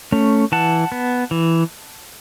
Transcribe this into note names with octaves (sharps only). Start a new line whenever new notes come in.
A3 C#4
E3 F#5 A5
B3
E3